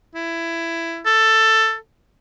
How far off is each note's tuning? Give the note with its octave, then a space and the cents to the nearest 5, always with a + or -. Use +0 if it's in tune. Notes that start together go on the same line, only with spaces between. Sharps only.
E4 +15
A4 +10